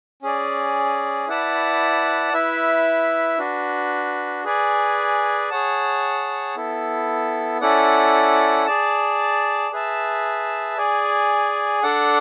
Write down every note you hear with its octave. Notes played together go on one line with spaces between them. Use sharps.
C#4 G#4 D5
E4 B4 D5 F#5 A5
E4 B4 E5
D4 F#4 B4
G#4 B4 D5 G#5
G#4 C#5 F#5 A5
B3 E4 A4
C#4 E4 A4 D5 F#5
G#4 D5 A5
G#4 B4 E5 A5
G#4 D5 G#5
D4 A4 D5 F#5